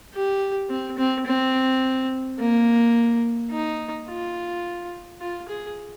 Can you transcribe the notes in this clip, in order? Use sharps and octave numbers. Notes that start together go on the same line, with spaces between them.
G4
C4
C4
C4
A#3
D#4
F4
F4
G#4